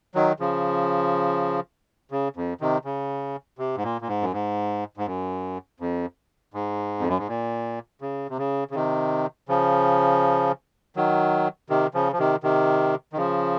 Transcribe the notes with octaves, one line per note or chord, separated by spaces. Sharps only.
D#3 F#3
C#3 F3
C#3
F2
C3 D#3
C#3
C3
G#2
A#2
A#2
G#2
F#2
G#2
G#2
F#2
F2
G#2
F2
F#2
G#2
A#2
C#3
C3
C#3
C#3
C3 D#3
C#3 F3
D#3 F#3
C3 D#3
C#3 F3
F3
C3 D#3
C3 D#3
D#3
C#3 F3